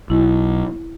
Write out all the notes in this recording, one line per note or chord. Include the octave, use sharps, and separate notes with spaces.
B1 E4